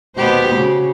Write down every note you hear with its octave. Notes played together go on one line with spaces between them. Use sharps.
D#2 G#2 B2 B3 G4 C5
C#3 F#4